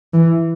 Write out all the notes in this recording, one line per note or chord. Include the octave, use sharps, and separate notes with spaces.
E3